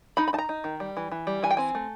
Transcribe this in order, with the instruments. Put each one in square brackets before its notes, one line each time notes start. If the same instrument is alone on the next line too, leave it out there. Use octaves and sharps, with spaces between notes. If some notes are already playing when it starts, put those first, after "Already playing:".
[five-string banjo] D#4 B5
B5
D#4 A5
A#5
D#4
D#3
G3
E3
E3
G3
E3 G#5
G5
C4 G#5
A3